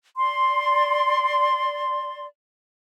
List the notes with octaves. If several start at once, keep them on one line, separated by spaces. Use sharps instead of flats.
D5 C6